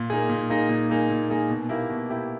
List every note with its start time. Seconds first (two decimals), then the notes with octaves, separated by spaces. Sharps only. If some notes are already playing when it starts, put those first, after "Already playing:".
Already playing: A#2
0.10 A#3 D#4 G#4
0.29 A#2
0.50 A#3 D#4 G#4
0.69 A#2
0.89 A#3 D#4 G#4
1.10 A#2
1.29 A#3 D#4 G#4
1.49 B2
1.69 A#3 E4 G4
1.90 B2
2.09 A#3 E4 G4